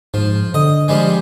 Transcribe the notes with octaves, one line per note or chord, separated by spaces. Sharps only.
G#2 F3
D3 D#5
F3 G3 G#3